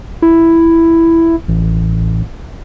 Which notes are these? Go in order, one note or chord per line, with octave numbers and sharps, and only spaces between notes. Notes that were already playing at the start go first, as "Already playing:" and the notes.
E4
A1